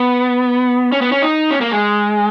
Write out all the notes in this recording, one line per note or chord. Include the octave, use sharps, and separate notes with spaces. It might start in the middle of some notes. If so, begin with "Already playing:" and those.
Already playing: B3
C#4
B3
C#4
D#4
C#4
A#3
G#3